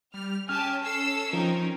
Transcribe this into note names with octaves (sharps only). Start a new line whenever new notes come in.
G3 F6
C#4 G4 G#5 A5 F6
A4 E6 C7
F3 C4 D#4 A#4